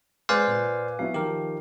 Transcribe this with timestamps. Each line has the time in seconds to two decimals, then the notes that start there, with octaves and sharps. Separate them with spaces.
0.29 G#3 B4 C5 D5 F5 G#5 D6
0.47 A#2
0.99 F#3 B3 E4 F5
1.14 D#3 F3 G4 A#4